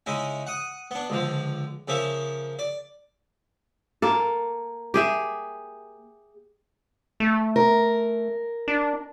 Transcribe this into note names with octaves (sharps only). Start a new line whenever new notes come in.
C#3 G#3 D#4 E4
F#5 D#6
B3 D4
C#2 D3 F3
C#3 F3 A#3 E5
D5
A#3 A4
G4 G#4 E5
A3
A#4
D4